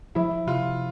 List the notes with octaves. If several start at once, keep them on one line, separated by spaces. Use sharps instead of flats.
F3 E4
C3 F4